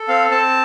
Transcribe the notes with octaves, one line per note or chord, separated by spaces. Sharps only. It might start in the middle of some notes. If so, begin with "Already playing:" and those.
Already playing: A4
C4 F5
C4 A5